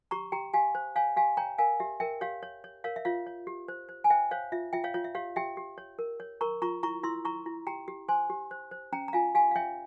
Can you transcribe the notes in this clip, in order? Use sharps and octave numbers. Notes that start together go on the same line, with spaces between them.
G4 A#5 C#6
G4 G5 A#5
G4 F5 G#5
C5
C#5 F5 G#5
G4 F5 G#5
C#5 G5 A#5
A#4 F5 G#5
G4 E5
A#4 E5 G5
G4 C#5 F5
C#5
C#5
A#4 C#5 F5
E5
F4 C#5 F5
C#5
G4
C5
C5
G#5
C5 E5 G5
C5 C#5 F5
F4 E5
F4 E5 G5
C#5 F5
F4 C#5
E5
G4 C#5 F5
G4 E5 G5
G4
C#5
A#4
C#5
A#4 A#5 C#6
F4 A#5 C#6
E4 A#5 C#6
E4 C6 E6
E4 A#5 C#6
E4
G4 G5 A#5
G4
C5 G#5 C6
G4
C5
C5
C#4 G5 A#5
A#5
F4 F5 G#5
G4 F5 G#5
F5
C#5 E5 G5